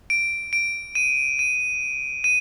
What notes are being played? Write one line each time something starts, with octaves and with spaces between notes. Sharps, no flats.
D7
D7
D#7
D#7
D#7